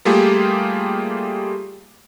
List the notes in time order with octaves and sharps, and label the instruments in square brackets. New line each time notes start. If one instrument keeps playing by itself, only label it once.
[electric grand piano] G3 A3 A#3 F4 G4 G#4